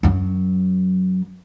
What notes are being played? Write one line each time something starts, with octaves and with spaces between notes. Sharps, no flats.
F#2 F#3